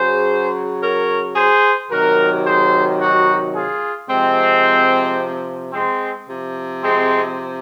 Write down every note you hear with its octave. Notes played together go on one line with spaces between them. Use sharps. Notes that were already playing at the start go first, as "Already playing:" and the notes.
Already playing: C#3 F#3 G#4 C5
A#4 C#5
G#4 C5
C3 D#3 F#3 F#4 A#4
G#4 C5
D#4 F#4
F4 G#4
C3 F3 G#3 C4
G#3 C4
C3 F3
G#3 C4